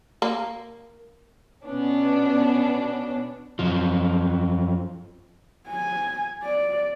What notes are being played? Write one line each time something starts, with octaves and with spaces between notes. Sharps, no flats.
A#3
B2 B3 C#4 D4
F#2 F3
G#5
D5